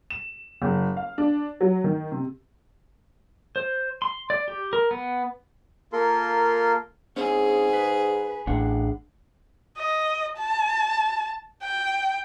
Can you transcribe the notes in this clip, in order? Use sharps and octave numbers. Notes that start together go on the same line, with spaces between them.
E7
F#1
F5
D4
F#3
D#3
C3
C5
C6
D5
G4
A#4
B3
A#3 F4 A4 A#4 C6
G#2 C4 C#4 G#4
B4
A1 D4 G#4 F#5
D#5
A5
G5